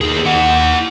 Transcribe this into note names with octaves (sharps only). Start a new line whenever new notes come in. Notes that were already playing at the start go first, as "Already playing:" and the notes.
D#2 B3 G#4
E4 F#5